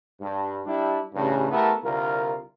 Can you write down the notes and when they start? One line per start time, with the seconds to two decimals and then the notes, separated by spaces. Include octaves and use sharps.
0.21 G2
0.66 G3 D4 E4
1.14 A1 G2 C#3
1.52 A3 B3 E4 G4 A4 A#4
1.84 C2 D3 F4 A#4